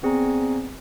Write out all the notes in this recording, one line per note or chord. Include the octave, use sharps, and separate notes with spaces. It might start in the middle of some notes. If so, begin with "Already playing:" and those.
B3 C4 G#4 D5 G#5 A#5